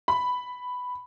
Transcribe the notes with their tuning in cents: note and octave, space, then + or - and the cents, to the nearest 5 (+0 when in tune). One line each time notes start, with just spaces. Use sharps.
B5 +5